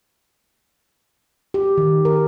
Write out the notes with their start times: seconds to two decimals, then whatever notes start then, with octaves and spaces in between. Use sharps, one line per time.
1.54 G4
1.78 D#3
2.05 A#4